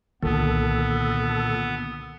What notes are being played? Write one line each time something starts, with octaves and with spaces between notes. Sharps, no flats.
C2 A#2 D3 D#3 B3 A4